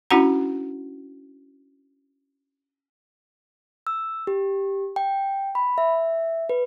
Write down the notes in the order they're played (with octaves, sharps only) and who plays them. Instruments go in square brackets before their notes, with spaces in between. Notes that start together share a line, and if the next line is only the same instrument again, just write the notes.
[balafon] C#4 D4 E4 F#4 F#5 A#5
[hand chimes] E6
G4
G5
B5
E5
B4